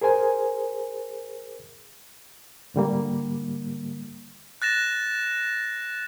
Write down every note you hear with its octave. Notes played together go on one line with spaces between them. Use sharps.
G#4 A#4 C5 G#5
G#2 D3 G3 A#3
F#6 A6 A#6 E7